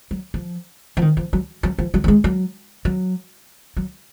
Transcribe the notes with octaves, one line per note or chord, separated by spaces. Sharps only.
F#3
F3
F3
D#3
F3
F#3
F#3
F3
F#3
F#3
G#3
F#3
F#3
F#3